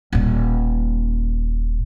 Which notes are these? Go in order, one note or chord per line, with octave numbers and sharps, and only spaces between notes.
D#1 A#2